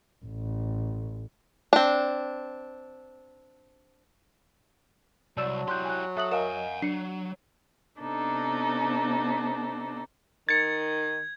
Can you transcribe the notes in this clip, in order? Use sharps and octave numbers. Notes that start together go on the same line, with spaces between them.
A1
C4 D4
C2 F#3 D5 A5 E6 E7
E4 G4 C6 F#6 G6
G#5 F#6
A4 E5 A5 D#6 F#6 F#7
A#4 D#5 F5 F#5 G#5 E7
F#3 D4 C7 C#7
C3 B3 D4 D#4 A4
D#3 G#6 A6 C#7